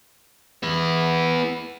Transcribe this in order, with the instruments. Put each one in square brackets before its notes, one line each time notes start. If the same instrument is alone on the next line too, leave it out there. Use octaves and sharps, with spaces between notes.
[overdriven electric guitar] B3 E4